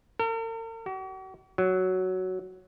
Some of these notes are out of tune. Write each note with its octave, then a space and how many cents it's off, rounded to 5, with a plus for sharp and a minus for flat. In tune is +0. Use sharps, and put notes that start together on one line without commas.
A#4 -45
F#4 +45
F#3 +5